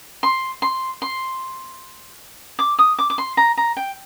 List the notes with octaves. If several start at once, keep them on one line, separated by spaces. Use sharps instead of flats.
C6
C6
C6
D6
D#6
D6
D6
C6
A#5
A#5
G5